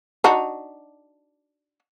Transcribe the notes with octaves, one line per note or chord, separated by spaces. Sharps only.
D4 D#4 F#4